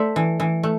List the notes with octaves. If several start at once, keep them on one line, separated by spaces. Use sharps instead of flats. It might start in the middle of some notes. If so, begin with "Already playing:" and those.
Already playing: A3 C5 D5 E5
E3
E3
A3